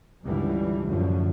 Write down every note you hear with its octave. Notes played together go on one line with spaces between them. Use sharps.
C#2 G2 D3 E3 G3
F#2 A2 D3 F3